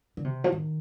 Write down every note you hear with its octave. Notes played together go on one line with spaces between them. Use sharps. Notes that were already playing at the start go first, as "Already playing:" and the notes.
D3
C3
F3
D#3